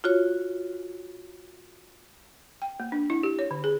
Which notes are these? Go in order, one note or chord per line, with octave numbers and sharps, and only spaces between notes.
F4 F#4 C#5
G5
A#3
D4
E4
G4
C#5
D3
G#4